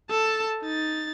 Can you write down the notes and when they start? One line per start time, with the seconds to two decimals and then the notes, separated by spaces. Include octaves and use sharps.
0.10 A4 A5
0.62 D#4 A6